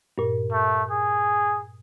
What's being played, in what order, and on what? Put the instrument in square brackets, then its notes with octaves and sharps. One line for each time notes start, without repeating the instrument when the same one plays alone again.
[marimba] G2 A#2
[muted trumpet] A3
G#4